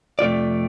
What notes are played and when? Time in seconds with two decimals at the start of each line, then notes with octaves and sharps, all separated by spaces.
0.19 F2 C3 A3 F4 D5